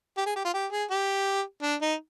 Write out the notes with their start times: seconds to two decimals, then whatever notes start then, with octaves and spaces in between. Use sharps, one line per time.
0.18 G4
0.27 G#4
0.36 G4
0.45 F4
0.54 G4
0.72 G#4
0.90 G4
1.63 D4
1.82 D#4